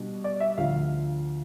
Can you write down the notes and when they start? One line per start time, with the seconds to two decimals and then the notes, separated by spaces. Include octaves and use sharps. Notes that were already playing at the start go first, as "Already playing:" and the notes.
Already playing: B2 G3 B3 D4
0.24 D5
0.40 E5
0.58 D2 D3 F3 F5